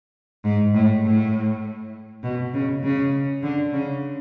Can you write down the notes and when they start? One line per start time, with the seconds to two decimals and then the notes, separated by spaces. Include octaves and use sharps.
0.45 G#2
0.74 A2
1.05 A2
2.23 B2
2.54 C#3
2.84 C#3
3.43 D3
3.73 C#3